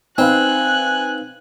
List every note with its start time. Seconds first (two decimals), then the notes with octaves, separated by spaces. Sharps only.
0.18 C4 D#4 B4 F5 G#5 F#6